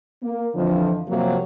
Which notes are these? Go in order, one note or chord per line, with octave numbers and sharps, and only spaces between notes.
A#3
F2 D3 E3 F3
C3 F3 F#3 A#3